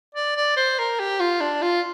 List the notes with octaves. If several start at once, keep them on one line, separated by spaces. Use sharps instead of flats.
D5
D5
C5
A#4
G4
F4
D4
F4